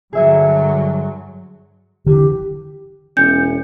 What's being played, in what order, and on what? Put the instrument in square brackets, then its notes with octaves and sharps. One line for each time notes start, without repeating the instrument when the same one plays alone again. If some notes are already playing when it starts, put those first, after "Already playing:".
[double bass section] G2 D3 F#3 [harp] G#4 E5 G#5
[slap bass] D3 E3 [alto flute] G4
[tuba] E1 [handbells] C#4 C#7 [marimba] G6